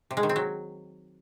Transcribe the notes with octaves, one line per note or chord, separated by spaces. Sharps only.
C3
G#3
D#3
C4
F#3